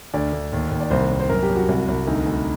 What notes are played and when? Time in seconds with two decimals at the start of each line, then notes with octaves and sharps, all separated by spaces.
0.14 D2 D5
0.33 D2
0.52 D#2
0.71 D#2
0.80 D5
0.90 C2 C5
1.11 C2
1.20 C5
1.29 F#2 A#4
1.43 G4
1.49 F#2
1.56 F#4
1.69 C2
1.88 C2
2.07 D2 D#4
2.26 D2